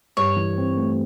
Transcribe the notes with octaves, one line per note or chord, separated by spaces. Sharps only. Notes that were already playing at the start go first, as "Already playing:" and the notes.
G2 C#5
E3
C4
A3